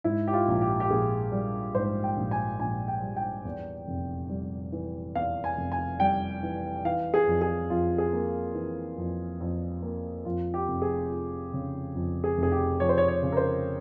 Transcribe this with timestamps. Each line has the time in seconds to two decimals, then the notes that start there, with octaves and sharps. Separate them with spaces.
0.04 G#2 E4
0.27 G4
0.33 F4
0.48 A#1
0.61 G4
0.80 G4
0.90 A#1 G#4
1.32 G3
1.75 G#2 C5
2.04 G5
2.17 A#1
2.31 G#5
2.60 A#1 G#5
2.88 G5
3.02 G3
3.16 G5
3.45 E2
3.87 F1
4.30 G3
4.72 E3
5.15 E2 F5
5.44 G#5
5.57 F1
5.72 G#5
6.00 G3 G5
6.43 E3
6.85 E3 F5
7.14 G#4
7.27 F2
7.41 G#4
7.70 F2 F4
7.98 G#4
8.13 A#3
8.55 E3
8.98 F2
9.40 F2
9.83 A#3
10.25 F2 F4
10.54 G4
10.68 F1
10.82 G#4
11.11 F3
11.53 C#3
11.96 F2
12.24 G#4
12.38 F1
12.43 G#4
12.52 G4
12.80 F3 C#5
12.89 C5
12.98 C#5
13.08 C#5
13.23 C#3
13.32 A#4
13.37 C5